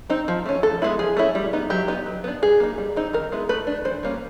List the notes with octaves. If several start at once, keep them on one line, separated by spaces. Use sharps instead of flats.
C4 D#4
F3
A3 C#4
E3 A4
G#3 B3 E4
F3 G#4
A3 C#4 E4
G3
B3 D#4
F#3 G4
B3 D#4
F#3
B3 D4
G3 G#4
A#3 D#4
G3
C4 D#4
D#3 A#4
G#3 B3 E4
A3 B4
D4
E3 C5
G3 A#3 C#4